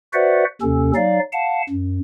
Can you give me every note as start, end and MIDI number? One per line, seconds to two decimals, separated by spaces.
0.13 0.44 66
0.13 0.44 71
0.13 0.44 72
0.13 0.44 74
0.13 0.44 76
0.13 0.44 78
0.62 0.92 39
0.62 0.92 48
0.62 0.92 61
0.62 0.92 69
0.95 1.19 54
0.95 1.19 63
0.95 1.19 74
0.95 1.19 77
1.32 1.62 77
1.32 1.62 78
1.32 1.62 81
1.69 1.99 42